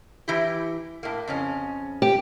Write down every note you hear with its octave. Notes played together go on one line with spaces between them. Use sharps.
E3 E4 G4
A2 A#3
F2 C#3 C#4
G4